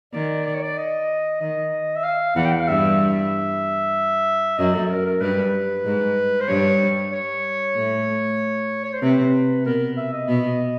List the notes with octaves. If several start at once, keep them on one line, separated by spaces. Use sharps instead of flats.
D#3 D5
D5
C#5
D5
D#5
D#3 D#5
E5
F5
E2 E3 F#5
G5
F#5
F5
G2 G3 E5
F#2 F#3 D#5
A4
A#4
A#4
G2 G3 B4
G#2 G#3
C5
G2 G3 C#5
C#5
A2 A3
C#5
C5
C3 C4 B4
B2 B3 A#4
E5
D#5
B2 B3